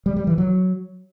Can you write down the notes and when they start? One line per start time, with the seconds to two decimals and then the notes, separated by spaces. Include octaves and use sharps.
0.06 G3
0.16 G3
0.27 E3
0.38 F#3